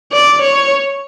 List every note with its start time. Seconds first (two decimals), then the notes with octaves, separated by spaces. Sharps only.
0.13 D5
0.41 C#5